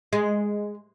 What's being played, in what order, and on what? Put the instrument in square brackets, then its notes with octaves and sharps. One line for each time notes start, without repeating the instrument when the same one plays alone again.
[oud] G#3